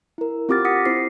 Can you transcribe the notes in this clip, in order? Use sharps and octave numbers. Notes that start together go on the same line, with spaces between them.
E4 A#4
C4 F4 G4 D6 F6 A6
F#5 D#6 A#6 B6 C#7
C4 E4 C5 C7